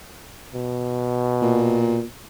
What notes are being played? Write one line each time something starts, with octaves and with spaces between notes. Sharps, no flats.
B2
A#2